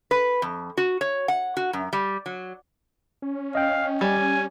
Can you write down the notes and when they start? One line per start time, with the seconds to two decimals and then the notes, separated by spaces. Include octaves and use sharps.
0.11 B4
0.42 F2
0.77 F#4
1.01 C#5
1.28 F#5
1.57 F#4
1.73 F#2
1.93 G3
2.26 F#3
3.22 C#4
3.55 D#5 F5 G5
4.01 G3 G#5